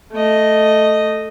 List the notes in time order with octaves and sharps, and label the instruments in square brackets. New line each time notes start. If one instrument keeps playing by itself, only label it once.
[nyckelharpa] A3 D#5